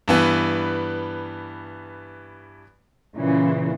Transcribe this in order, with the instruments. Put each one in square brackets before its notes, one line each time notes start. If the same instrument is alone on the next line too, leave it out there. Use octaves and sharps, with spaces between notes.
[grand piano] G2 E3 B3
[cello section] A#2 C#3 E3